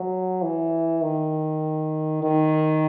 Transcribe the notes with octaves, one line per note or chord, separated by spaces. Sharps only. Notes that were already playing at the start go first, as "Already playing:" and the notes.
Already playing: F#3
E3
D#3
D#3